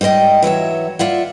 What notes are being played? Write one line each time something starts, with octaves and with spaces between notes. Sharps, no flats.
G#2 G3 B4 D#5 G5
E3 F#3 C#5 E5
F4 D5 E5 F#5